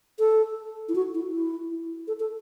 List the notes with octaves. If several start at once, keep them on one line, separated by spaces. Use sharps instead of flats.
A4
E4
F#4
E4
E4
A4
A4